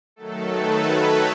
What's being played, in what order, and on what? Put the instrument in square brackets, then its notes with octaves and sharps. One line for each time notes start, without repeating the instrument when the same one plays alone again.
[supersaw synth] D#3 F#3 A3 A4
B4
C#5